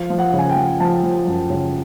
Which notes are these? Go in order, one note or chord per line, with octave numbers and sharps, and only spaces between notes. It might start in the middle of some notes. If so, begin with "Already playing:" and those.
Already playing: F3 F5
F3
F#5
C#3
G#5
G5
F3
F3 A5
F3
F#2
C#3